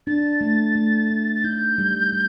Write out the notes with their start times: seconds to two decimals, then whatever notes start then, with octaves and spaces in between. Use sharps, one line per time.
0.07 D4 A6
0.41 A3
0.76 A3
1.10 D4
1.35 A6
1.44 D#4 G6
1.78 G3
2.13 G3